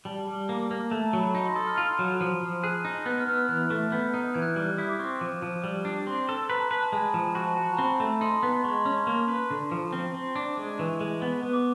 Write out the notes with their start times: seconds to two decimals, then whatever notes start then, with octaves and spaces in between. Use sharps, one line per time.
0.05 G3 A5
0.27 G3
0.49 A#3
0.71 A#3
0.91 A3 A5
1.05 A#5
1.13 F#3
1.20 B5
1.35 D#4 A#5
1.46 C6
1.56 A4 D#6
1.67 F6
1.77 F4
1.99 F#3
2.21 F3
2.41 F3
2.63 G#4 F#6
2.85 D#4
3.06 B3 F#6
3.20 F6
3.27 B3
3.35 E6
3.49 E3 F#6
3.70 A3
3.92 B3 G6
4.14 D#4
4.34 E3 G#6
4.42 F#6
4.50 G6
4.56 G3
4.63 F#6
4.77 E4 D#6
4.89 D6
4.99 C4 C#6
5.21 F3 D6
5.42 F3
5.64 G3
5.85 D4
6.07 C4 C6
6.29 A4
6.49 B4 A#5
6.60 A5
6.71 B4 B5
6.82 A5
6.92 G#3 G#5
7.14 F3
7.35 F#4 A5
7.57 F#4
7.74 A#5
7.78 C4 B5
8.00 A3
8.21 D#4 C6
8.43 B3
8.64 G#3 C#6
8.76 C6
8.85 C#4 C#6
8.98 C6
9.07 A#3 C#6
9.28 B4
9.51 D3
9.72 F3
9.93 C4
10.14 C4
10.35 D4 D6
10.57 G#3
10.79 E3 C#6
11.00 G#3
11.22 B3
11.43 B3
11.53 D6